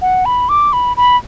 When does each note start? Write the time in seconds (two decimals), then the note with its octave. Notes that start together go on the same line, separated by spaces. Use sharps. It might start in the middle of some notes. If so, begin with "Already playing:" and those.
0.02 F#5
0.25 B5
0.49 D6
0.73 B5
0.97 B5